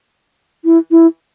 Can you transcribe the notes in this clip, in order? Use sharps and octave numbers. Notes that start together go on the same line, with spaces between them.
E4
E4